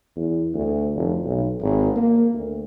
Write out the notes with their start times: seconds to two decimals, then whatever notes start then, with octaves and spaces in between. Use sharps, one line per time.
0.16 E2
0.54 D2
0.95 F1
1.25 B1
1.62 G#1
1.96 A#3
2.34 D2